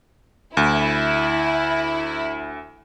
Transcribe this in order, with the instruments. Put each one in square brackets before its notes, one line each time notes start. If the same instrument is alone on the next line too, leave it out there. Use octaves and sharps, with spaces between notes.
[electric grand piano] D2 [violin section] E4